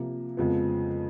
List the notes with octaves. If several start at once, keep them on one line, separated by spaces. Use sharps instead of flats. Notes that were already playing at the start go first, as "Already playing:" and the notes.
Already playing: C3 F3 A#3
F2 C#3 F3 G#3 B3